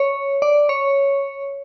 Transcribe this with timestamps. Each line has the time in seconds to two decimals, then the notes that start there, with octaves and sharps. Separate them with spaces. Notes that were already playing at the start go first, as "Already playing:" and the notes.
Already playing: C#5
0.42 D5
0.69 C#5